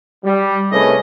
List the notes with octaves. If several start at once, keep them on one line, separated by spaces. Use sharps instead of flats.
G3
C2 A3 C#4 G#4 B4 D#5